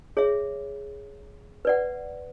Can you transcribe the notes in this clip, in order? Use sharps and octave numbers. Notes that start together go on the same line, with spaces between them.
G#4 C#5 E5
B4 D5 F#5